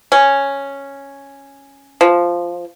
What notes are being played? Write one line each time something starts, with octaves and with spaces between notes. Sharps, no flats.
C#4
F3